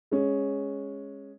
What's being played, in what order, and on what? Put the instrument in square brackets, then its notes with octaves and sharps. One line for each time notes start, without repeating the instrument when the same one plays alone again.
[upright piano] G#3 C#4